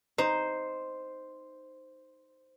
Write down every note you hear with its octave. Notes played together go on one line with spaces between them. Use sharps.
D#4 C5